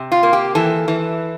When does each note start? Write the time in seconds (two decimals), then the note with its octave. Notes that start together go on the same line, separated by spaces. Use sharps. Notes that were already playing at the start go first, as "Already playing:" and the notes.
Already playing: C3
0.12 F4
0.23 A#3
0.33 G4
0.55 E3 A4
0.88 E3